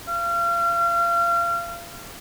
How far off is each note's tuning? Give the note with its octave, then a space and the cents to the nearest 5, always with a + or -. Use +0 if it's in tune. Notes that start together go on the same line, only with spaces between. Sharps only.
F5 -35